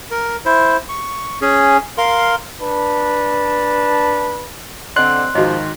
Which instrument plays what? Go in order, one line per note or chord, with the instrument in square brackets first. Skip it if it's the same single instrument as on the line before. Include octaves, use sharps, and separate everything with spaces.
[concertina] A#4
E4 C5
C#6
C#4 G#4
A#4 F5 C6
[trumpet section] D4 B4 A5
[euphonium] D3 [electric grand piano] C4 D5 [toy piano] D#5 [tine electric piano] C6 F#6
[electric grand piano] G#2 D#3 [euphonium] F3 [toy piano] F#4 D#5